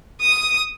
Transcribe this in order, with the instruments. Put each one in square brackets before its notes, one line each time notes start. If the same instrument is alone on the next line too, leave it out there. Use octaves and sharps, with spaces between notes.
[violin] D#6